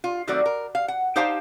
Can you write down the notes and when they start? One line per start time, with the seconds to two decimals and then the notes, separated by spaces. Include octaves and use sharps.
0.04 F4
0.27 D#3 F#3 A3 C4 F#4 D5
0.46 A#4
0.75 F5
0.88 F#5
1.16 D#4 G4 C5 F5 G5 A5